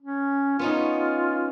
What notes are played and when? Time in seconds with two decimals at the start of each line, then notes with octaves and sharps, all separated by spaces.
0.01 C#4
0.59 B3 C#4 D#4 F4